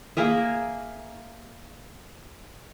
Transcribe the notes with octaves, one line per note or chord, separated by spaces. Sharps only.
A#3 G#4 A#4 E5